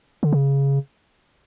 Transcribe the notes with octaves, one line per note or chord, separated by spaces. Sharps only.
D3
C#3